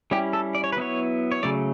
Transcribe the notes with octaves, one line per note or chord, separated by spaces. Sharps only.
G3 C#4 E4 G4
A4
D5
C#5
B4
F#3 B3 E4 C#5
C#5
C#3 F#3 A3 D5